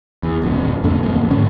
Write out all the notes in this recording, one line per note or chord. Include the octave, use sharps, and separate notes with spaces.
E2
D1 A#1 F2 A#2
F2 A#2 D3 A3
D1 F2 A#3
A1
G#2 D3 C#4